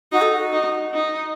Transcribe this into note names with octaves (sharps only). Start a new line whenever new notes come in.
D#4 F#4
A4
F#4
D#4
D#4